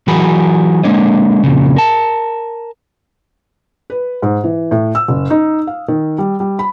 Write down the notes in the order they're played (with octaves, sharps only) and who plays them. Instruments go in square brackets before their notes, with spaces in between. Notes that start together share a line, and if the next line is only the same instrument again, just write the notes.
[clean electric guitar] E3 F#3 F#4 G#4 A#4 B5
G#3 A#3 D4 C#5 D#5
F2 A#2 C#3
A#4 A5
[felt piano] B4
G#2
E3
A2
E6
F#1
D#4
F5
D#3
G3
G3
B5